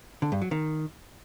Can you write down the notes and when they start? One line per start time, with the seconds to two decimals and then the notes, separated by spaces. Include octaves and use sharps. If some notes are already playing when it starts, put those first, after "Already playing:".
0.22 D3
0.32 G2
0.42 F#3
0.51 D#3